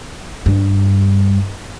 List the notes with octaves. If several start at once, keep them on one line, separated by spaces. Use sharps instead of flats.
G2